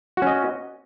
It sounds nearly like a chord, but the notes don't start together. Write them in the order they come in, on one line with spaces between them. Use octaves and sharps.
F#4 C#4 D#5